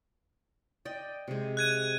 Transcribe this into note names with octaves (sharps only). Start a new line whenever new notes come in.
D5 D#5 G5
C3 G#3
F#6 G#6 D#7